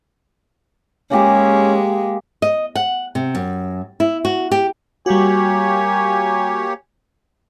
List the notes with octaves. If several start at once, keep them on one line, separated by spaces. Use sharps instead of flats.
G#3 A#3 C#4 G4 G#4
D#5
F#5
C3
F#2
E4
F#4
G4
G3 A#3 F#4 G4 C#5 G#5